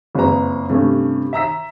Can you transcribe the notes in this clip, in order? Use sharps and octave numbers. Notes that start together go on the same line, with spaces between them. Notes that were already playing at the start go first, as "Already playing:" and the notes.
F#1 F2 G#3 B4 A#5
G2 C3 A3 C#4
E5 A#5 E6 B6